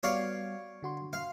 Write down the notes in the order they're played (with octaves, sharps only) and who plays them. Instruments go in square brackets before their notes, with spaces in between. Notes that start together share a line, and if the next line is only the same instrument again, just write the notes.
[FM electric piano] G3 B3 F#4 [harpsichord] C#5 D5 F5
[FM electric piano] D3 F#4 C6
[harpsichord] F5